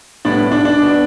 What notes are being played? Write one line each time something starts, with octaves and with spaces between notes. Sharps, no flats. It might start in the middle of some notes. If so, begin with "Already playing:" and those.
A2 G3 B3 D4 D5
D4 D5
D4 D5
B2 B3